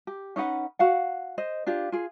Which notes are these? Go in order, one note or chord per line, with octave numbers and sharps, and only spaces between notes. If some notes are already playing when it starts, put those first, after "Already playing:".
G4
C#4 D#4 B4 F#5
F#4 F5 F#5
C5 D#5
D4 F4 G4
F4 G#4